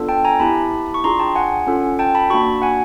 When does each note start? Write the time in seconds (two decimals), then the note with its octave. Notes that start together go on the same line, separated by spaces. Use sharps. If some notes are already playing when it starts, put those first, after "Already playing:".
Already playing: B3 D4 F4 A4
0.09 G5 A5
0.24 G#5 A#5
0.40 B3 E4 G4 A5 B5
0.94 C#6
1.04 D4 F4 G#4 A#5 C6
1.19 G5 A5
1.35 F#5 G#5
1.67 C#4 F4 A4
1.99 G5 A5
2.15 A5 B5
2.30 A#3 D4 F#4 B5 C#6
2.62 F#5 G#5